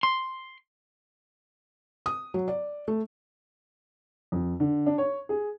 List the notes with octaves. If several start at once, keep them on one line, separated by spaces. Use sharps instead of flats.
C6
D#6
F#3
D5
A3
F2
D3
D4
C#5
G#4